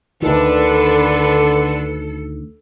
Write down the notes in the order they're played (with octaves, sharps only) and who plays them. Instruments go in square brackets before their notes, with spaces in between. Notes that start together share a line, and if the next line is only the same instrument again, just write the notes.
[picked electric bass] D2 D#3 [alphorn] D3 [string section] D4 B4 [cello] A4